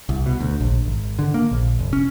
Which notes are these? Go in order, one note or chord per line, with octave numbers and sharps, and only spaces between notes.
C2
B2
D2
A#1
G#1
D3
A#3
A#1
F1
C#4